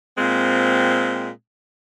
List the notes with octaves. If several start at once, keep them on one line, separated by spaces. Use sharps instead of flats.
A#2 G#3 C4